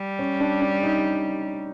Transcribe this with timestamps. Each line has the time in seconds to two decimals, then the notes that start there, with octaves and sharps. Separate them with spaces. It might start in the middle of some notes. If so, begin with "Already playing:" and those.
Already playing: G3
0.19 C#4
0.40 D4
0.62 D4
0.83 D#4